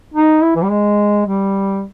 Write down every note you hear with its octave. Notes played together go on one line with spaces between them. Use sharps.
D#4
E4
E3
G3
G#3
G3